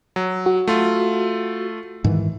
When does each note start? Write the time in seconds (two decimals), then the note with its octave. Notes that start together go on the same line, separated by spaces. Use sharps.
0.16 F#3
0.46 F#4
0.67 A3 F4
2.04 G#2 D#3 E3